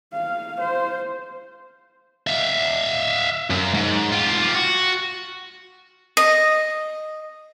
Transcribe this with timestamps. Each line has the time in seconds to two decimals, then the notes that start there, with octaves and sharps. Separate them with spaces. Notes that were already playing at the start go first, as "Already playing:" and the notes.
0.13 F5
0.60 C5
2.27 E5 F5
3.50 F#2
3.74 G#2
4.12 F4 G4
4.55 F#4
6.17 D#5